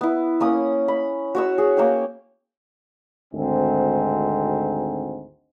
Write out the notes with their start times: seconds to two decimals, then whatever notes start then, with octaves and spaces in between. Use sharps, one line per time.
0.01 B3 E4
0.40 A#3 C#4 D#6
0.88 B5
1.35 F#4 C#5 E6
1.58 G#4
1.77 A#3 C#5 G5
3.34 G#1 D2 G#2 C4